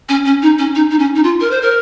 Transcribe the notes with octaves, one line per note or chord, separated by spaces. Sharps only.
C#4
C#4
D#4
C#4
D#4
D#4
C#4
D#4
F4
A#4
C5
A#4